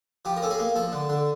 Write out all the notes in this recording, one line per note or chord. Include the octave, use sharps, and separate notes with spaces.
F3 G4
A#4
C#4 A4
G#4
A#3
F3 A4
D3
D3